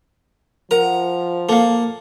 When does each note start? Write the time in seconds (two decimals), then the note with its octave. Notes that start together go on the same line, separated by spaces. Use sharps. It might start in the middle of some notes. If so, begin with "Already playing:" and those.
0.71 F3 A#4 F#5 A#5
1.49 A#3 A4 F5